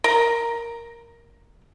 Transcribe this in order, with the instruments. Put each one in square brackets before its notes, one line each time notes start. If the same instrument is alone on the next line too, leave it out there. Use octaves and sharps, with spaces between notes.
[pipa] A#4 A#5